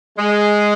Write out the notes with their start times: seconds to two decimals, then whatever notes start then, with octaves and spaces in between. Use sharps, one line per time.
0.19 G#3